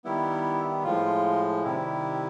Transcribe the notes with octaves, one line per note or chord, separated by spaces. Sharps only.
D#3 G3 B3 E4
A2 F3 G#3 F4
C3 D#3 G3 E4